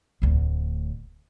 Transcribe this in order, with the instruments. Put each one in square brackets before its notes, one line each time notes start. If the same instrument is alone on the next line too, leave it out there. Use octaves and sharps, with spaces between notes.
[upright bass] D1 D2